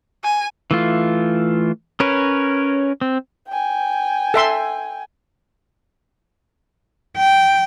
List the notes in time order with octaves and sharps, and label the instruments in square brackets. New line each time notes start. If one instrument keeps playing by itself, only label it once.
[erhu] G#5
[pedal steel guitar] E3 A3 F4
C#4 A#4 B4 C#5
C4
[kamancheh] G5 G#5
[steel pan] A4 E5 C6
[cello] G5